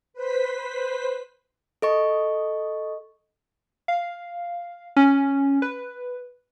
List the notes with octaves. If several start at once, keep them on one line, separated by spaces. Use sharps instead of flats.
B4 C5 B6
A4 D#5 C#6
F5
C#4
B4